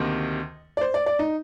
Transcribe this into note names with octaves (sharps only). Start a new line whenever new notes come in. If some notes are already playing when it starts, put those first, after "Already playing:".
Already playing: D2 C3 D#3 A#3 D#5
D5
C5
D5
D5
D#4